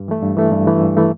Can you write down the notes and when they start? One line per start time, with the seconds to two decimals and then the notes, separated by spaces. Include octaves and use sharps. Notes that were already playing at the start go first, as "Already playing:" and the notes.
Already playing: G2
0.08 E3 A3
0.23 G2
0.36 E3 A3
0.52 G2
0.67 E3 A3
0.81 G2
0.97 E3 A3